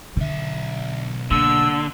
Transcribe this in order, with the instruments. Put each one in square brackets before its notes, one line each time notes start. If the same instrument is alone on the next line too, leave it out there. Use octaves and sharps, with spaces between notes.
[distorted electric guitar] B1 E5 [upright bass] D3
[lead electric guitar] D3 [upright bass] A#3 [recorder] E6